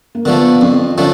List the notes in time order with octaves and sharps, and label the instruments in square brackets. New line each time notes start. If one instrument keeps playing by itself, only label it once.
[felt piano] A#3
[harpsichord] D3 F3 A3 [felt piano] B3
[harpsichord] F2 [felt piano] C4
[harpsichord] D3 F3 A3 [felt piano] C#4